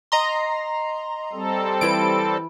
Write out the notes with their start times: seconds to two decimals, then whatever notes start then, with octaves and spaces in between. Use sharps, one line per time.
0.12 D#5 A#5 C6
1.33 G3 C4 A4
1.81 E3 E4 B4 D7